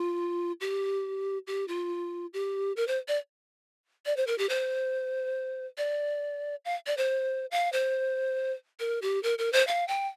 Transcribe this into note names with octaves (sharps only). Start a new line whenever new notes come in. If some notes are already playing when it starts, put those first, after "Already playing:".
Already playing: F4
G4
G4
F4
G4
A#4
C5
D5
D5
C5
A#4
G4
C5
D5
F5
D5
C5
F5
C5
A#4
G4
A#4
A#4
C5
F5
G5